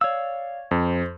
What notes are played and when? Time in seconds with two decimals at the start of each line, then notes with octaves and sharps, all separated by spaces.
0.01 C#5 D5 F5 E6
0.71 F2 C5